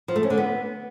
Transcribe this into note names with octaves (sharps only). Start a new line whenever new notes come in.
F3
A3
C#4
D3
B3